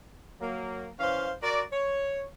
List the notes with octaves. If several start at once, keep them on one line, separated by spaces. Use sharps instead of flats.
F#3 A#3
E3 C#4 C5 F5
F#4 A#4 D5
C#5